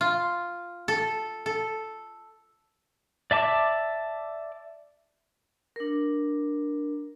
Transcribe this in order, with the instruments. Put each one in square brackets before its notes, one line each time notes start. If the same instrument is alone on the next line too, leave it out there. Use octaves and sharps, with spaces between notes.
[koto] F4
A4
A4
[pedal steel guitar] D5 E5 A5 D6
[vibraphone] D4 A#4